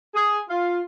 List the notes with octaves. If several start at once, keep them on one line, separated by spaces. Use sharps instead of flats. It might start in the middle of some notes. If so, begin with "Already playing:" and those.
G#4
F4